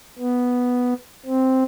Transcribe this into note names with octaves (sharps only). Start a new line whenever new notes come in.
B3
C4